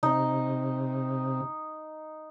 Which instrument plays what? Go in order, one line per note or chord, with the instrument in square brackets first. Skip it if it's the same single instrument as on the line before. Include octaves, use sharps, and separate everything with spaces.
[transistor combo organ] C3 [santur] D#4